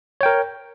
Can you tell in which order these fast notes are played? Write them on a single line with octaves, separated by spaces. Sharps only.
C#5 G5 A#4